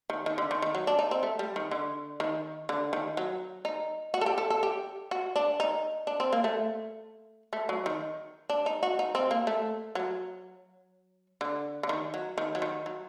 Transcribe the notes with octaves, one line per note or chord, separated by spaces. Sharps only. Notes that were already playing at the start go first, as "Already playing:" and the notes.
D#3
D#3
D3
D#3
D#3
F#3
D4
D#4
C4
A3
G3
D#3
D3
D#3
D3
D#3
F#3
D#4
F#4
A4
G4
A4
A4
G4
F#4
D4
D#4
D4
C4
A#3
A3
A3
F#3
D#3
D4
D#4
F#4
D#4
C4
A#3
A3
F#3
D3
D3
D#3
F#3
D#3
F#3
D#3
F#3